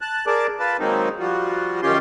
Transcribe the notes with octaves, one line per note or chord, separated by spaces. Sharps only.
A5 F#6
G#4 A#4 D5 A5 D6
F4 B4 A5
D#3 F#3 G#3 A#3 C4 D#4
F3 G3 F4 F#4
F#2 D#3 C#4 F4 G4 C6